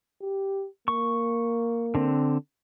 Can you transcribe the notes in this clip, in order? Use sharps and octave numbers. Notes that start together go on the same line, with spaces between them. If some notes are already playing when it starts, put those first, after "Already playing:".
G4
A#3 C#6
D3 C4